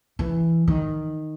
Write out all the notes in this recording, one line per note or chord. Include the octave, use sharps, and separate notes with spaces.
E3
D#3